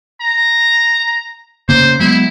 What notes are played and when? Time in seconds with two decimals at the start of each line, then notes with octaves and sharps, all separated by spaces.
0.21 A#5
1.69 C#3 A#3 C5
2.00 F#3 G#3 B3 E4